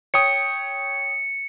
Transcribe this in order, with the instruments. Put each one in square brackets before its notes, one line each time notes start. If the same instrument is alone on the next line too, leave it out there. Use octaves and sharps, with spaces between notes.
[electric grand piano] C#5 G5 D#6 [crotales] C#7